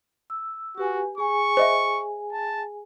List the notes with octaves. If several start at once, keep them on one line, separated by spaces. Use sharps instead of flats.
E6
F#4 G4 B4 G#5
G#4 G#5 C#6
C5 D#5 E5
A5